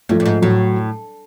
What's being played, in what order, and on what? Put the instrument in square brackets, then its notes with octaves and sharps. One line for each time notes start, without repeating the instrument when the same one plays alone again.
[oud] G2 [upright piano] F3 A3
[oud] G2
G#2
[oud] A2 [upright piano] F#3